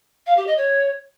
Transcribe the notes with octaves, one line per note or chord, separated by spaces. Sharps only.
F5
G4
D#5
C#5